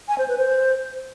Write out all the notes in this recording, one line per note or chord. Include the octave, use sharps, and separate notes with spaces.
G#5
C5
B4
C5